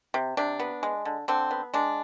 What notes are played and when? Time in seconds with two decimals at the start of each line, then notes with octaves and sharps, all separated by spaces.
0.14 C3
0.37 C3 D4
0.60 B3
0.83 G#3
1.05 D3
1.28 D3 C4
1.51 B3
1.74 G#3 D4